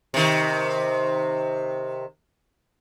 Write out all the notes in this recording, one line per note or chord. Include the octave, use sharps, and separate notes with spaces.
C3 D#3